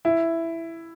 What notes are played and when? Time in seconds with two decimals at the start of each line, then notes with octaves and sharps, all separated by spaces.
0.05 E4